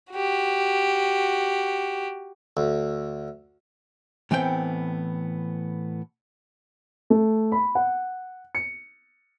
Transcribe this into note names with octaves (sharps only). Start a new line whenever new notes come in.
F#4 G4
D2
A2 E3 B3 C4 G5
A3
B5
F#5
C#7